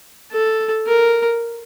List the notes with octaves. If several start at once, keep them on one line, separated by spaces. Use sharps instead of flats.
A4
A#4